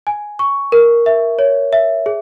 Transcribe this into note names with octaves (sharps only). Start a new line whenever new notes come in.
G#5
C#6
A#4
E5
C#5
E5
G#4